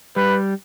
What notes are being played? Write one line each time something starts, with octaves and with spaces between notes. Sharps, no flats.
G3 B4